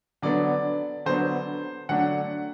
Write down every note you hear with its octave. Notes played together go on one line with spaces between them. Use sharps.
D3 F#3 B3 D4 D5
D3 F#3 B3 D4 C5
D3 F#3 A3 D4 F#5